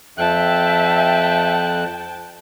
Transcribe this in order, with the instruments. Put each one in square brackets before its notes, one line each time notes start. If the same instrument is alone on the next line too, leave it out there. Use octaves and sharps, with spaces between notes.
[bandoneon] F2 F#6 [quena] E5 [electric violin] G5 A5